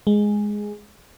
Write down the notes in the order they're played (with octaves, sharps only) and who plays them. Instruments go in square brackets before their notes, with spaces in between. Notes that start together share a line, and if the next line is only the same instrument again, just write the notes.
[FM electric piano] G#3